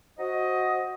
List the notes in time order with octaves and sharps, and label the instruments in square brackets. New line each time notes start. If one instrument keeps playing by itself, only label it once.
[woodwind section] F#4 C5 D#5